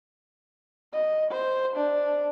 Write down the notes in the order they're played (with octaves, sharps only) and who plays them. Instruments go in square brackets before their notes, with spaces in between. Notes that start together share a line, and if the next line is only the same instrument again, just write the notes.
[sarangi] D#5
C5
D4